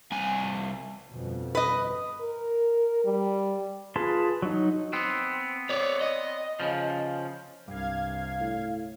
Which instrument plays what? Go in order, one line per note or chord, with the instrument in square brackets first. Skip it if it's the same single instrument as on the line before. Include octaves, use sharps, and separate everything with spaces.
[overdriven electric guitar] C2 G#5
[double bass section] G1 F2 B2
[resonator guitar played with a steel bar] B4 D#5
[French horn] A#4
G3
[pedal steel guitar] F4 G#4 B4 A5 C6
F#3 D#4
[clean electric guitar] B3 C4
[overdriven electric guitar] C#5 D5
D#5
[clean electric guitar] C#3 F3
[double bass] C2 [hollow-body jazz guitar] G2 [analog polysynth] F5 G#6
[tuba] A2